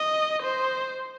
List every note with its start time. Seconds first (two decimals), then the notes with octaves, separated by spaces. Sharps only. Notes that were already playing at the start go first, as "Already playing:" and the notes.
Already playing: D#5
0.42 C5